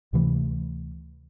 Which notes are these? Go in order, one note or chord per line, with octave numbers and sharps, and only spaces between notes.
D2 C3 E3 A3